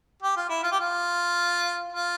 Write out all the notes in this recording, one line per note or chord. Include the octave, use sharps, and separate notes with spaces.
G4
F4
E4
F4
G4
F4
F4